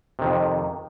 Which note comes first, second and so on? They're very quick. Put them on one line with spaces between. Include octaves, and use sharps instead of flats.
C3 D#3 F2